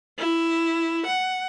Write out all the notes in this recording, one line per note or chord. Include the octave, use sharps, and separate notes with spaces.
E4
F#5